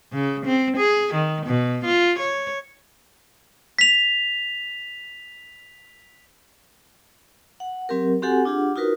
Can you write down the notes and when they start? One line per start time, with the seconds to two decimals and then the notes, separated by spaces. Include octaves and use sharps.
0.13 C#3
0.46 C4
0.77 G#4
1.14 D#3
1.46 B2
1.85 F4
2.19 C#5
3.79 B6 F7
7.60 F#5
7.89 F#3 C4 G4 A#4
8.22 C4 F#4 G4 A4 F#5 G#5
8.45 D4 F4 G4 G#4 F#5
8.76 D#4 F4 F#4 A#4 B4